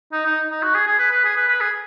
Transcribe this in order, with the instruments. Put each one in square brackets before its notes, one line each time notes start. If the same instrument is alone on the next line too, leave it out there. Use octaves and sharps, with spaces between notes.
[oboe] D#4
D#4
D#4
F#4
G#4
G#4
B4
B4
G#4
B4
B4
G#4